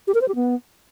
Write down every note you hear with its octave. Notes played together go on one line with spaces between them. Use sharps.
G4
A#4
C5
G4
B3